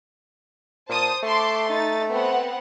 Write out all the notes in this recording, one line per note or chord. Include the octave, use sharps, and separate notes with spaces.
A#2 C5 A5 D#6
A3 A5 C6 D6
D#4 A6
B3 C4 F#5